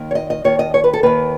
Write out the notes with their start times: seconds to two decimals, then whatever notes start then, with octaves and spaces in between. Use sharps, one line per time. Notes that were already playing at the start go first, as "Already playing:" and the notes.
Already playing: D#2 D#3
0.11 C#5
0.15 D#5
0.30 D#5
0.44 D#2 D#3 C#5
0.59 D#5
0.74 C#5
0.84 B4
0.93 A4
1.03 D#2 D#3 B4